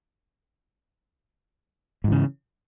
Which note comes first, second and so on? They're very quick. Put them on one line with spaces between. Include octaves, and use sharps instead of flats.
G#2 E3 C#3